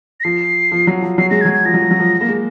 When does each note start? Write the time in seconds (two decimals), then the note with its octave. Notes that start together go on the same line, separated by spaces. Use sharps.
0.20 A#6
0.24 F3 C7
0.72 F3
0.87 F#3
1.02 F3
1.18 F#3 C7
1.30 G#3 A#6
1.41 G#6
1.45 F#3
1.54 G#6
1.65 F3 A#6
1.74 F#3
1.82 F3
1.91 F#3
1.99 F3
2.21 A#3
2.29 G#3